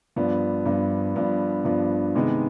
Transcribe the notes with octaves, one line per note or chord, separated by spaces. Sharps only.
G2 F3 B3 D4
G2 F3 B3 D4
G2 F3 B3 D4
G2 F3 B3 D4
C3 D#3 G#3 B3 D#4